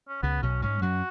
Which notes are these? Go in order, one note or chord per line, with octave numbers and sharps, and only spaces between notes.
C#4
C#2 C#3 B3
B1 B2 C#4
G#2 G#3 C#4
F#2 F#3 F#4